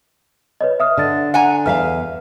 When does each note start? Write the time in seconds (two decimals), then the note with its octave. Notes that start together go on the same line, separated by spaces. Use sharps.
0.61 B4 C#5 D#5
0.80 E5 D#6 F6
0.97 D3 D5 A6
1.34 F#5 G#5 A#5
1.66 E2 E5 F5 F6